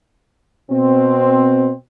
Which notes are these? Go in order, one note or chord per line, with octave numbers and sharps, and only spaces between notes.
B2 C4